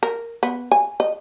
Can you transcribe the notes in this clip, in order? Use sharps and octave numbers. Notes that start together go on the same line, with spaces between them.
A#4
B3
G#5
D#5